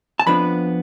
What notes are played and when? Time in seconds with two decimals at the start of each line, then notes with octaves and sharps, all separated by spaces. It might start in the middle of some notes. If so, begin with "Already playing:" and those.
0.19 A5
0.26 F2 F3 B3 D4 B4 B5